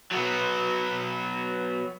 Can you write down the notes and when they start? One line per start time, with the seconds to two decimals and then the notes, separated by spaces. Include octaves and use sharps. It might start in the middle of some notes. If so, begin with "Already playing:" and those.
0.11 F#3 B3